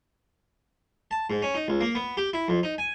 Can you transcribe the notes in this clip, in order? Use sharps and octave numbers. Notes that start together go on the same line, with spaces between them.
A5
G#2
C#4
D#4
C#2
A#3
B3
G4
E4
F2
D#4
G#5